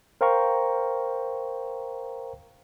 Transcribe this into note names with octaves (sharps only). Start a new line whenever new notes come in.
A#4 C5 F5 G5 A#5 C#6